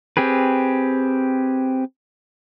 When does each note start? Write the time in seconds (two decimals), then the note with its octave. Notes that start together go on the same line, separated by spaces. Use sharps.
0.17 C4 G4 G#4 B4